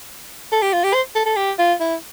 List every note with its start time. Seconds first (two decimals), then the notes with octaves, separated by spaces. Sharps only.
0.52 A4
0.62 G4
0.73 F4
0.84 G4
0.94 C5
1.15 A4
1.26 A4
1.36 G4
1.58 F4
1.80 E4